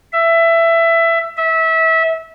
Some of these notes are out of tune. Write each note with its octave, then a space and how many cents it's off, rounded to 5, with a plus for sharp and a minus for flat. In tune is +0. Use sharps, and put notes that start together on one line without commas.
E5 +15
E5 -25